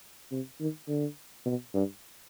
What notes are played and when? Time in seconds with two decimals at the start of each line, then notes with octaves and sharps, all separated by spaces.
0.31 C3
0.60 D#3
0.88 D3
1.46 B2
1.74 G2